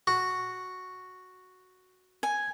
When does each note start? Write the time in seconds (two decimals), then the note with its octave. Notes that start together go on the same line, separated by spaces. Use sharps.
0.07 F#4
2.23 G#5